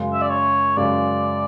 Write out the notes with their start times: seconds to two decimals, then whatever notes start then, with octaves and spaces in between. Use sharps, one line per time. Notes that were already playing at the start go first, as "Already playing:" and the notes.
Already playing: F#2 C#3 G#3
0.13 E5
0.21 D5
0.30 C#5
0.76 F#2 C#3 G#3 D5